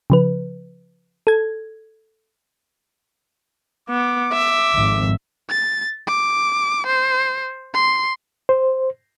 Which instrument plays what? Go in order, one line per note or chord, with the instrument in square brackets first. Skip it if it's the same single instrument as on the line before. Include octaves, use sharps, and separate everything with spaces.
[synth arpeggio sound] C#3 F3 B4
A4 G#6
[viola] B3 [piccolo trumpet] D6
[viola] E5
[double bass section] G#1 F2 G#2
[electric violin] A6
D6
C5
C6
[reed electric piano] C5